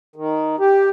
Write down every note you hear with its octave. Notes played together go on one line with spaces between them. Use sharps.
D#3
G4